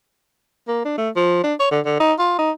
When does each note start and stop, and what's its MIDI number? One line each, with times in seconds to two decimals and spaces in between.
0.68 0.80 58
0.85 0.98 62
0.98 1.10 57
1.16 1.39 53
1.43 1.54 62
1.60 1.68 73
1.71 1.80 50
1.85 1.98 50
2.00 2.13 63
2.19 2.34 65
2.39 2.51 63